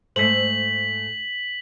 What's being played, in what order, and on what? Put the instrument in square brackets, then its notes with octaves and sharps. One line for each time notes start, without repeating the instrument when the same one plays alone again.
[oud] G#2 A3 C5 [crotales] B6 F#7